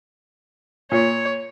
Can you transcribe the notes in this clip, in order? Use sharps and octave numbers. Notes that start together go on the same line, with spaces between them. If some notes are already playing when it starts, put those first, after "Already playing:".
A#2 C#5